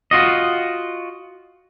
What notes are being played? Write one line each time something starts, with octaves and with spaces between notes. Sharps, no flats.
F4 F#4 D#5